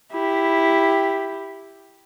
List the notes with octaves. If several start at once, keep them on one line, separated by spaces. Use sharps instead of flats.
E4 G4